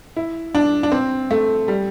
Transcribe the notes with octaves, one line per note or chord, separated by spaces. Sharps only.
E4
D4
D4
C4
A3
G3